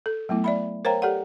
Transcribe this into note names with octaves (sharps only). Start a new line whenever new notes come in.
A4
F#3 A3 B3 E4
D5 E5 B5
A#4 C5 C#5 F5 G5 A#5
G4 A4 D5 F#5